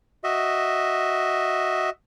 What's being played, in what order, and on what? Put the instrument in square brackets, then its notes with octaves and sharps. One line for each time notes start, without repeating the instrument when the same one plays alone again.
[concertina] F#4 D#5 E5